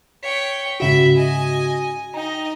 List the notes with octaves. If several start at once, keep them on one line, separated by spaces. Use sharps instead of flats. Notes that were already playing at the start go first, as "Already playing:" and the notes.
C#5 G5 B6
G#2 C#3 F#4 E5 B5
D#5 G#5
D#4 D#5 G5 A#5